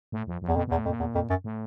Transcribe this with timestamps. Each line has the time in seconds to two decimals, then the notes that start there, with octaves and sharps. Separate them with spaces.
0.12 A2
0.27 F2
0.42 F2
0.48 E2
0.56 F2 B2
0.67 B2
0.71 E2
0.78 A2
0.85 F2
0.89 A#2
1.00 E2
1.15 F2
1.30 F#2
1.44 A2